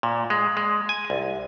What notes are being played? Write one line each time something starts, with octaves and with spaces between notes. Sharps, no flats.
A#2
G#3
G#3
G#5
C2